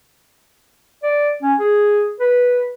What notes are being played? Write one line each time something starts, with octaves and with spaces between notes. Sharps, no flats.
D5
C#4
G#4
B4